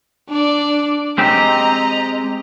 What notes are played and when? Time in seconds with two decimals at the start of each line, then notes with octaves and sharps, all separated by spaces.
0.29 D4 D5
1.18 G#3 C4 G4 D#5 A#5